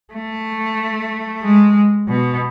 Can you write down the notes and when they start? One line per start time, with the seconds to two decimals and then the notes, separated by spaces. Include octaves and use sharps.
0.14 A3
1.43 G#3
2.08 B2